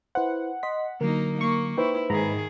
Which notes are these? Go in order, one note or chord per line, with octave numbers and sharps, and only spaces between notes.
E4 B4 C5 F#5
D#5 C6 B6
D3 F#3 A#3 D#4 A#4
A#3 C#6
D#4 E4 B4 C5 G5
G#2 D#3 G#4 A#5 B5